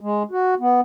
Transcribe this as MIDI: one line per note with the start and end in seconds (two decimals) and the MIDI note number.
0.01 0.23 56
0.31 0.55 66
0.60 0.81 59